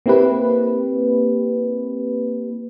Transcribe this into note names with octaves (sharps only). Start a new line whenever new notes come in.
A#3 C4 E4 G4 B4